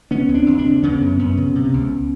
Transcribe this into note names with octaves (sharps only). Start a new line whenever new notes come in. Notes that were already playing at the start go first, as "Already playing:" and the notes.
C#3 B3 C#4
D#2
C4 D4
D#2
C4 D4
C#3
C#3 B3 C#4
F#2
F#2 B3 C#4
C#3
C3
C#2